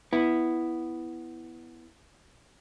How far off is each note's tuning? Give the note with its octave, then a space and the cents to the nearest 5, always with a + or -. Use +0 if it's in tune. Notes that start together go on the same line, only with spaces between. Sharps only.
B3 +0 E4 +0